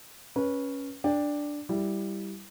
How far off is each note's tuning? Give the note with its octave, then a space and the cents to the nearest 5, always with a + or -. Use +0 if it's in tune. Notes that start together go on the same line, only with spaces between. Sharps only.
C#4 +0 B4 -20
D4 +0 G5 +20
G3 +0 E4 +0